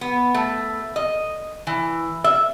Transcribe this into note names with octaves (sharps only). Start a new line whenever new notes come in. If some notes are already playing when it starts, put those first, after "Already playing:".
B3
A3
D#5
E3
E5